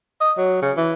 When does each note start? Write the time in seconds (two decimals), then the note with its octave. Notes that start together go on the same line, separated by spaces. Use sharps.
0.20 D#5
0.37 F#3
0.62 C#3
0.77 E3